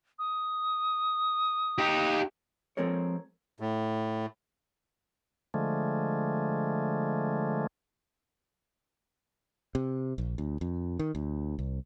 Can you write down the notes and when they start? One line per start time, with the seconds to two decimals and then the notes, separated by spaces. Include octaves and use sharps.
0.19 D#6
1.78 D#4 G4
2.77 F3 G#3 C4 A4 A#4 C#5
3.60 A2
5.54 D3 F3 G#3 A3
9.75 C3
10.18 A#1
10.38 D2
10.61 F2
10.99 D#3
11.15 D2
11.59 C2